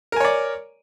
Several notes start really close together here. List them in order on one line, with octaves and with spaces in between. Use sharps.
A#4 G#5 C#5 D5